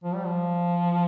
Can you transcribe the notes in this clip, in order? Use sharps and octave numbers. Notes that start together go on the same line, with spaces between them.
F3
G3
F3